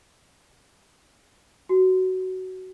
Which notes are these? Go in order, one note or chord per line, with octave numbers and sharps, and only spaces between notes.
F#4